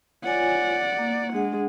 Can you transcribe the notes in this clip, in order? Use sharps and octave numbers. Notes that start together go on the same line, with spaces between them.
F4 C#5 D5 F#5 G#5
A#3
G#3 D4 G#4 F#5